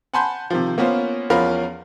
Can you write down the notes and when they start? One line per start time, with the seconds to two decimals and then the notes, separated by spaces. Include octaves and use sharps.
0.14 F#5 G#5 A5 B5 C6 G6
0.50 C3 D#3 F3
0.78 A#3 B3 C#4 F4 C5
1.30 E2 F3 C#4 A#4 F5 B5